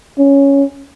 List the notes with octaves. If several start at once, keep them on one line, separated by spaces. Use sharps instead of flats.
C#4